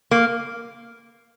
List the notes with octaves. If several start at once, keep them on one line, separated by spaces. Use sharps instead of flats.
A#3